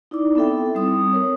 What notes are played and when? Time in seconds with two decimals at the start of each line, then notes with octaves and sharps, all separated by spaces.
0.11 D#4 E4 D5 D6
0.35 B3 C4 E4 A4 E5 G5
0.75 G3 C4 D#6
1.13 A#4 C#5